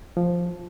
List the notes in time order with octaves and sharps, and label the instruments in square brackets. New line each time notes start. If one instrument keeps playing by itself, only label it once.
[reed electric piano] F3